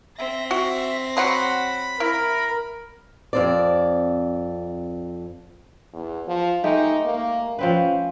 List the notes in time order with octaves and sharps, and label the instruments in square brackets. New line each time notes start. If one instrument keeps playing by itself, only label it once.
[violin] C4 A#6 [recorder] E5
[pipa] F#4 [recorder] E5
[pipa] F#3 F#5 C6 [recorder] B5
[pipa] E4 [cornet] A#4
[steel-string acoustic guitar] F2 C4 D5
[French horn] E2
F3
[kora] G#3 A3 G4 [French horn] D#4
[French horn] A#3
[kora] F3 C4 B4 [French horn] C#4